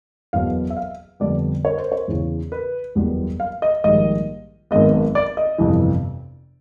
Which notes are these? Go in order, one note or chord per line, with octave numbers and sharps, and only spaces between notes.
F#1 E2 B2 F#3 B3 F5
E5
F5
F2 D3 G3 B3 D5
C#5
C5
C#5
E2 C#3 E3
B4
F#1 E2 B2 G3 B3
F5
D#5
A#1 G#2 D#3 G3 D#5
G#1 F#2 D#3 G#3 B3 D#5
D5
D#5
G1 F2 C3 E3